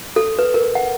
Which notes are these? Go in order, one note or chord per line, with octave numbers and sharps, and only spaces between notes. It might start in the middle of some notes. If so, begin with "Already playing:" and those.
A4
B4
A#4
F#5